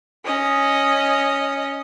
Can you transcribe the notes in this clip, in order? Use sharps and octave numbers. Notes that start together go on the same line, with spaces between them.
C#4 D#5